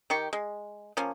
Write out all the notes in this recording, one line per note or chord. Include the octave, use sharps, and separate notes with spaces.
D#3 G4 C#6
G#3
F3 A#3 C#4